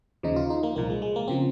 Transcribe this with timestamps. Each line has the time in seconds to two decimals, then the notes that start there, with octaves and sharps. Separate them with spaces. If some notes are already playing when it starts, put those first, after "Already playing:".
0.23 D#2 C#3 F3 D#4
0.36 F4
0.50 D#4
0.63 A#3
0.76 C2 A#2 F3 A#3
0.90 G#3
1.02 G#3
1.16 A#3
1.28 C#3 F3 C4